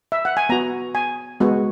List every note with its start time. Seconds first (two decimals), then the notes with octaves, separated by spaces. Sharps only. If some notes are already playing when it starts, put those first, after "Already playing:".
0.12 E5
0.25 F#5
0.37 G#5
0.49 B3 F#4 A#5
0.95 G#5
1.40 G#3 B3 F#4